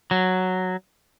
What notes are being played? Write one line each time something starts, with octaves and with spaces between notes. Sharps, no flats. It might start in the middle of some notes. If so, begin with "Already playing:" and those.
F#3